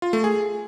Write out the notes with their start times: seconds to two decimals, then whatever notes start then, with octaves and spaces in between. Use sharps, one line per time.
0.02 F4
0.13 A3
0.24 G#4